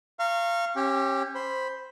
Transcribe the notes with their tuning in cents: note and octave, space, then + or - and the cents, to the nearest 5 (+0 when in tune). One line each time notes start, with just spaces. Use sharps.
F5 -20 A#5 -25 C#6 -25
C#4 -30 G4 +0
C5 +0 B5 +0